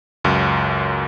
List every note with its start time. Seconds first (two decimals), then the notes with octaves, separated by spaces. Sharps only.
0.24 C#2 F#2